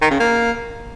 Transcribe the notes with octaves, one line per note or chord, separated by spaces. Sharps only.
D#3
C#3
A#3